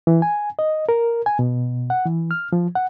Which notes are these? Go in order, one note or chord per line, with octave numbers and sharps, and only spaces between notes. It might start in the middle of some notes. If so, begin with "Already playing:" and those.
E3
G#5
D#5
A#4
G#5
B2
F#5
E3
F6
F3
F#5